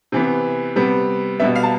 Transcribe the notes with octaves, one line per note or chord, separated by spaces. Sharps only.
C3 E3 B3
C3 G3 B3
B2 G3 B3 E5
F5
A5